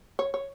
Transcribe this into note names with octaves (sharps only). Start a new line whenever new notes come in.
C#5
C#5